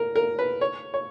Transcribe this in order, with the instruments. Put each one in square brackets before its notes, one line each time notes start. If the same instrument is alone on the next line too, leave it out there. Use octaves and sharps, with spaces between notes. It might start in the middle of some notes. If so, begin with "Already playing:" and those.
Already playing: [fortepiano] A#4
A#4
B4
C#5
C#5